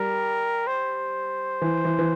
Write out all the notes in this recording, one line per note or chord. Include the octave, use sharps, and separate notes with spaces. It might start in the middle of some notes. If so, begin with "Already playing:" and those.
Already playing: G3 A#4
C5
E3
E3
E3